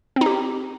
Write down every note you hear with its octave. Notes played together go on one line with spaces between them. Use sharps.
C4 D#4 G4